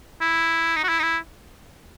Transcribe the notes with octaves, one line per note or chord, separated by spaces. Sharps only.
E4
D#4
F#4
E4
D#4
E4